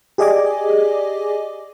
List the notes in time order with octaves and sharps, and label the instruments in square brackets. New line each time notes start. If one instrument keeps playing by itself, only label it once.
[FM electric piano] G4 G#4 D5 D#5 G#5 D6